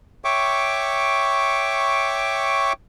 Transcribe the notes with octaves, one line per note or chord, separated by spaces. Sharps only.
C#5 E5 G5 C#6 D6